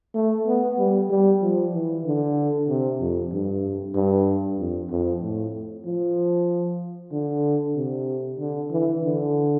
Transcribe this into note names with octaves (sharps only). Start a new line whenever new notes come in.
A3
B3
G3
G3
F3
E3
D3
C3
F2
G2
G2
F2
F2
A2
F3
D3
C3
D3
E3
D3